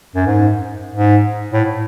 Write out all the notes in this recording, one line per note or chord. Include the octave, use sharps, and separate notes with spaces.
F#2
G#2
G#2
A2